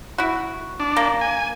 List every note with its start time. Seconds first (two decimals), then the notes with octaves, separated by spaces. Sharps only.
0.18 E4 F#4
0.80 D4
0.96 A#3
1.21 G#5